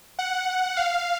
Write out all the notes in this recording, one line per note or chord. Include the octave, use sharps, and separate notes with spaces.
F#5
F5